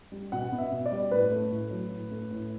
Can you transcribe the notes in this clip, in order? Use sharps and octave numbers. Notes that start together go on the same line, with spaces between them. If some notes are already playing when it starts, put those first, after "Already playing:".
G3
B2 F#5
B3
E5
B2
D5
G3
A2 B4
A3
A2
F#3
A2
A3
A2